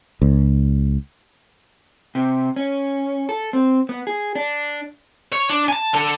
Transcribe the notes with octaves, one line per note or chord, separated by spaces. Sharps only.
C#2
C3
C#4
A4
C4
B3
G#4
D4
C#5
D4
G#5 A5
D3 A4